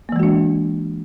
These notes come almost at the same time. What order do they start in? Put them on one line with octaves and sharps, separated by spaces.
A#3 E3 G#3 F#4 D4